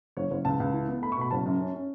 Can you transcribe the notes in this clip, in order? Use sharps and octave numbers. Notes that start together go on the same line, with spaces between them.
F#1 C#5
F#1
C#2 A5
C#2
E3
B3
A3 B5
C#6
B2 B5
F#1 A5
F#2
C#4
C#4